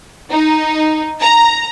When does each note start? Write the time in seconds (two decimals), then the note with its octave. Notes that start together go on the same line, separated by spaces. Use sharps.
0.30 D#4
1.21 A#5